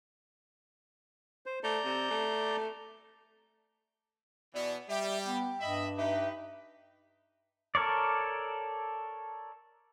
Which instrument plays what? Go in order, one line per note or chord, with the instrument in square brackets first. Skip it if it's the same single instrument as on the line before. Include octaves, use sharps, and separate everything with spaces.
[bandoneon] C5
[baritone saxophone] A3 [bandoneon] D5 A#5 G6
[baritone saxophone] C3
A3
[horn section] B2 E3 B3 [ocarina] D5
[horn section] G3 G4 [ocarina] E5
[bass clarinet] B3 [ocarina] G5
[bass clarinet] G2 [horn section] D#5 E5 B5
[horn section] D#4 G4 B4 [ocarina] E5
[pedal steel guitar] A4 A#4 C#5 D5